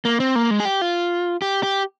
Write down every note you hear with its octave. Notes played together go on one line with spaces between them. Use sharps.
A#3
C4
A#3
G#3
G#4
G4
F4
G4
G4